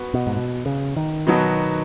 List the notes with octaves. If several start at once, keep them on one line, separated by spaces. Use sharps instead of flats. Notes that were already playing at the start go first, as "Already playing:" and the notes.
Already playing: B3 F#4
B2
G#2
B2
C#3
D#3
B2 F#3 B3 D#4 F#4